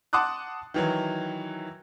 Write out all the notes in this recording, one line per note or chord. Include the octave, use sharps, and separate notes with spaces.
F#5 A5 C6 D6 D#6 F#6
D#3 E3 F#3